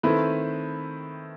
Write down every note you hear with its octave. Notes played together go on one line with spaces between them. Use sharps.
D#3 A3 C4 E4 B4